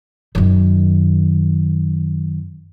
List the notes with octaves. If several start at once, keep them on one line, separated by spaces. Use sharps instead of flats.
F#2 D#3